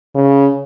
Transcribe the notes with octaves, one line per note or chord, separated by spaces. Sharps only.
C#3